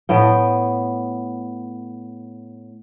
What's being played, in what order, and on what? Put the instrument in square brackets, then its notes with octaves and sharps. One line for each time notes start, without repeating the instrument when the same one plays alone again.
[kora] A2 B3 G5